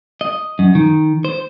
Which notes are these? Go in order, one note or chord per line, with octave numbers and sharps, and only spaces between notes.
D#5
F#2
D#3
C5